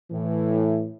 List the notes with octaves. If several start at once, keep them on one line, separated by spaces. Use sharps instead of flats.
A2 E3